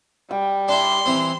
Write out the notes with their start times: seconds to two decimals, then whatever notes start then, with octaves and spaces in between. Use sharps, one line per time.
0.31 G3 G5
0.69 D4 E4 C6
1.06 E3 C4